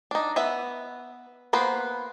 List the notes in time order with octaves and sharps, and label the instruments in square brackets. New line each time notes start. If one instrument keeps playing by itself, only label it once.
[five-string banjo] D4 D#4
B3 B4 E5
A#3 B3 B4 C5